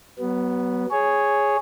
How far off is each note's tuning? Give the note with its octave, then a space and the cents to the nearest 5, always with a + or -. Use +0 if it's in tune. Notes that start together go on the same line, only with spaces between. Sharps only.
F#3 +30 B3 +0
G#4 +0 C#5 +0